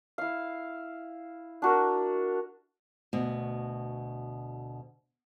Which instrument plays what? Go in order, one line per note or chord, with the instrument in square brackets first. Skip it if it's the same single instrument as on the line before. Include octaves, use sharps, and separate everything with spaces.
[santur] E4 F5
D4 F#4 A#4
[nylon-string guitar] D2 B2